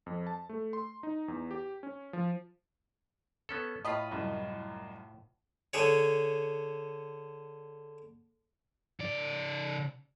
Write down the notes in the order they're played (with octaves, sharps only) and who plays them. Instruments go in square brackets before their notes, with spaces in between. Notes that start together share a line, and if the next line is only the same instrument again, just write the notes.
[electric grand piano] F2
A5
A3
C6
D#4
E2
G4
C#4
F3
[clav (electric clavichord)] B3 C#4 A4
[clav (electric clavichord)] A2 F4 [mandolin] D#5 B5
[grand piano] C2 F#2
[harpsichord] D3 G#4 C#5
[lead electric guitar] C#3 D5